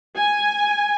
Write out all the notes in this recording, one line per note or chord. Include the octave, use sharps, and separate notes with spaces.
G#5